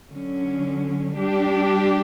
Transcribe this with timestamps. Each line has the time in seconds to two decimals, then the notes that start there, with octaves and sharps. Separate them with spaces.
0.11 D3 F#3 C#4
1.16 G3 D4 G4